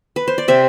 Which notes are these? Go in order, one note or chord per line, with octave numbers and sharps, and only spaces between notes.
B4
C5
D5
C3 C5 E5